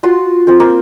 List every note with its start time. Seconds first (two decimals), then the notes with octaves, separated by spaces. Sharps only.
0.03 F4 F#4 F#5 C6
0.47 C4 F4 C5
0.60 A#3 C4